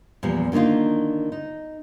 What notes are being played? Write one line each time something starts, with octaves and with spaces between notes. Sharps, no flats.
E2 A#2 F3 G3
D3 D#3 A#3 D#4 F4
D#4